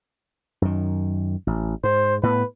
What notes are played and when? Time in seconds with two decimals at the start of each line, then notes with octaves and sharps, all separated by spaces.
0.62 F#2 D#3
1.47 A1
1.84 G#2 C5
2.23 A2 B3 B4